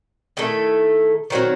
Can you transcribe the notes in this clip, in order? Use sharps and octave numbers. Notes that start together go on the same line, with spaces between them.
D#3 A3 E4 A4
D#3 F#3 C4 F#4